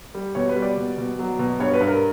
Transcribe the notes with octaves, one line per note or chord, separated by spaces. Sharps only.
G3
B2 C#5
B4
G3
D5
B2
B2
F#3
B2
G2 C#5
B4
G2
A#4